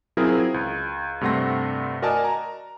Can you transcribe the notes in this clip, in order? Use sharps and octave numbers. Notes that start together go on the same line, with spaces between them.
F#3 C4 E4 F4 G#4 A#4
C#2
G2 C3 A3 F#5 C6 A#6
F#4 A#4 D5 D#5 G#5 A5
A#5